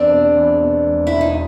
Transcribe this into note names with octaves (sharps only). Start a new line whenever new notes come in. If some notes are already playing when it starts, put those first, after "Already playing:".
Already playing: E2 C4 D4
B2
E2
B2
E1
E1 E4
D#4